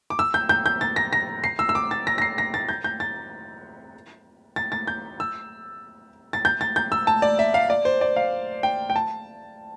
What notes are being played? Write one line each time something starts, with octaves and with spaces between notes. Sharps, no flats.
D6
E6
G6
G6
G6
A6
A#6
A#6
C7
E6
E6
D6
A6
A#6
A#6
C7
A#6
A6
G6
G6
A6
A6
A6
G6
E6
A6
G6
A6
G6
E6
A5
D5
E5
F5
D5
C5
D5
F5
G5
G5
A5